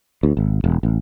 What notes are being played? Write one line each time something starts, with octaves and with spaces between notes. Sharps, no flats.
D2
G#1
E1
A1